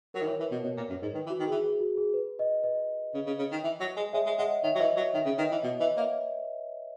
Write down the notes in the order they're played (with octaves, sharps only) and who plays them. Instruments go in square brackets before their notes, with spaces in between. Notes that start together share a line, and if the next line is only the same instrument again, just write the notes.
[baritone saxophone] F#3 [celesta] A#4
[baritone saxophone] D#3
[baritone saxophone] E3 [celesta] C#5
[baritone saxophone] E3 [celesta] B4
[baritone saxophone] B2
[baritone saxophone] B2 [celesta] C#5
[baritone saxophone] A#2
F#2
G#2
[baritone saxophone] D#3 [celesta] B4
[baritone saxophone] E3
[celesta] F#4
[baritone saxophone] D#3
[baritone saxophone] E3 [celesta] G#4
[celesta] G#4
F#4
G#4
B4
B4 D#5
B4 D#5
[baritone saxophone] C#3
C#3
C#3
D#3
E3
F#3
G#3
[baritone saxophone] G#3 [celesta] C#5 E5
[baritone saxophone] G#3
[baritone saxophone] G#3 [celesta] D#5 F#5
[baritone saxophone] D#3 [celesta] C#5 E5
[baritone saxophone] F#3
[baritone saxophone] E3 [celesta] B4 D#5
[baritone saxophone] F#3 [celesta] C#5
[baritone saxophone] D#3 [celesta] C#5 E5
[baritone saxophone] C#3
[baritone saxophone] D#3 [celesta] B4 D#5
[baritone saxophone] E3
B2
[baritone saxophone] E3 [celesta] B4 D#5
[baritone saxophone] A#3 [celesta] C#5 E5